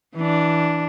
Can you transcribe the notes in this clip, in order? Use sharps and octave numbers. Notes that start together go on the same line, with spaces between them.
E3 D4